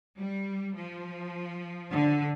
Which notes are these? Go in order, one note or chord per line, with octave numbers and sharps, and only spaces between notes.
G3
F3
D3